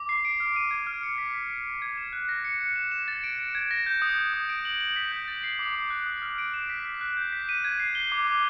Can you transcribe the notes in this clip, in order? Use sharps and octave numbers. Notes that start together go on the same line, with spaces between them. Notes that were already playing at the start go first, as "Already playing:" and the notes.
Already playing: D6
C7
D7
F6
D#7
G#6
F6
C#7
B6
B6
D7
D7
G#6
E7
F#6
A#6
C#7
C#7
E7
E7
A6
D7
D7
G#6
A#6
G6
D#6
D#6
D#6
D7
F#7
F#7
B6
G6
A6
C7
D6
D6
F#6
D#6
F6
D7
E7
B6
B6
F#6
G6
B6
D#7
G#6
C7
G7
D6
D6